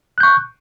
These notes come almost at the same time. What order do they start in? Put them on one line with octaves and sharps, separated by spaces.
F#6 G6 C#6